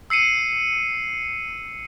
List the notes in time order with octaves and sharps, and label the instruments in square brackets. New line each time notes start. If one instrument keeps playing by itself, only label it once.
[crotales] E6 C7 C#7 D#7